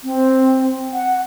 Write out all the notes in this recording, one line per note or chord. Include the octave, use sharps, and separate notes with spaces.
C4
F#5